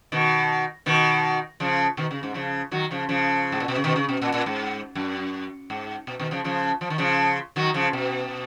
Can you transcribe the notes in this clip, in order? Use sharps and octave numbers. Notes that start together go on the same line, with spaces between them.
B2 D#3
B2 D#3
C#3 F3
B2 D#3
C#3
G#2
C#3 F3
D#3 F#3
C#3 F3
C#3 F3
G#2
A#2
B2
C#3
B2 D#3
C#3
B2
A#2
A#2
G#2
F#2
G#2
B2
B2 D#3
C#3 F3
C#3 F3
F3
D#3
C#3 F3
D#3 F#3
C#3 F3
B2